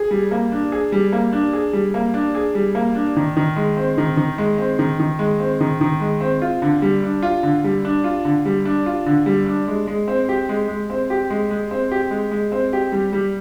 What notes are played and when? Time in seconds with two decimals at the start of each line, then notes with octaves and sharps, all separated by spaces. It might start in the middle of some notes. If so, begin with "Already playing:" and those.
Already playing: G#4
0.11 G3
0.31 A#3
0.52 D4
0.72 G#4
0.92 G3
1.12 A#3
1.33 D4
1.53 G#4
1.73 G3
1.94 A#3
2.14 D4
2.35 G#4
2.55 G3
2.75 A#3
2.95 D4
3.17 D#3
3.37 D#3
3.56 G#3
3.77 C4
3.98 D#3
4.17 D#3
4.38 G#3
4.58 C4
4.79 D#3
5.00 D#3
5.19 G#3
5.40 C4
5.60 D#3
5.81 D#3
6.00 G#3
6.21 C4
6.42 F4
6.62 D3
6.82 G3
7.03 D4
7.23 F4
7.43 D3
7.64 G3
7.85 D4
8.04 F4
8.25 D3
8.46 G3
8.65 D4
8.86 F4
9.06 D3
9.26 G3
9.46 D4
9.68 G#3
9.87 G#3
10.08 C4
10.29 G4
10.49 G#3
10.68 G#3
10.90 C4
11.10 G4
11.30 G#3
11.51 G#3
11.71 C4
11.92 G4
12.11 G#3
12.31 G#3
12.52 C4
12.73 G4
12.92 G3
13.13 G3